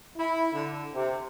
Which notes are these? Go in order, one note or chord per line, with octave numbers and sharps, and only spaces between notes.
E4
D3
C3